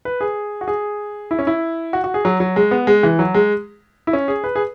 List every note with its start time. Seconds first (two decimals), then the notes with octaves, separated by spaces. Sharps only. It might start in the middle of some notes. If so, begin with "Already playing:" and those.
0.05 B4
0.21 G#4
0.61 F#4
0.68 G#4
1.31 E4
1.39 C#4
1.47 E4
1.93 F#4
2.04 F#4
2.14 G#4
2.25 F#3
2.40 F#3
2.56 G#3
2.71 B3
2.87 G#3
3.03 E3
3.19 F#3
3.34 G#3
4.07 E4
4.13 C#4
4.28 G#4
4.44 B4
4.56 G#4